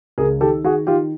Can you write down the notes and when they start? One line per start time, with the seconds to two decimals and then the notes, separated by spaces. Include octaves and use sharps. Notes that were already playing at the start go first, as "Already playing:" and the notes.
0.18 C#2 G#4 A#4
0.40 D#3 G4 A4
0.64 D#3 F#4 G#4
0.87 D#3 F4 G4